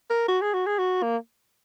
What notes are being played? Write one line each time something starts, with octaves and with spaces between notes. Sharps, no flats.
A#4
F#4
G#4
F#4
G#4
F#4
A#3